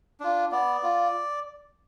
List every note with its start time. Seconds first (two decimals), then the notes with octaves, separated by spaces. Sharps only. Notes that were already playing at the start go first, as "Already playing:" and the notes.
0.20 D4 F4
0.52 B3 D5
0.83 F4